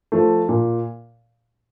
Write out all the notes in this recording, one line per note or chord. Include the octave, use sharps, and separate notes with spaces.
F3 A3
A#2